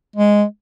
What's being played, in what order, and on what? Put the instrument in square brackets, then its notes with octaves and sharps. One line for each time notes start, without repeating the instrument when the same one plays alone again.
[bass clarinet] G#3